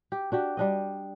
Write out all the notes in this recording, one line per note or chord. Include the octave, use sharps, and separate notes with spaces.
G4
D4 F#4 G4
G3 D4 D#5